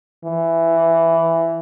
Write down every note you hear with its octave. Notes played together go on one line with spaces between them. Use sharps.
E3